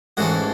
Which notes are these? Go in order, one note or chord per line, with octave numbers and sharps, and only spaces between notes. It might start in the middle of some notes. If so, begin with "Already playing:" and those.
A1 G#2 E3 A3 F#4